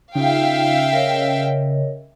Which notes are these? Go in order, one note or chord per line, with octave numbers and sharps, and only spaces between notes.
C#3 D#4 F4 E5 F5 G5
A#4 C#5 D#5